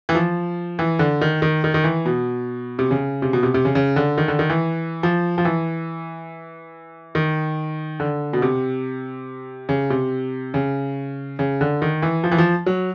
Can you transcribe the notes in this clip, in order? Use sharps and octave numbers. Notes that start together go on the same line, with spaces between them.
E3
F3
E3
D3
D#3
D#3
D#3
D#3
E3
B2
C3
C#3
C3
B2
C3
C3
C#3
C#3
D3
D#3
D3
D#3
E3
F3
F3
E3
D#3
D3
B2
C3
C#3
C3
C#3
C#3
D3
D#3
E3
F3
E3
F3
F#3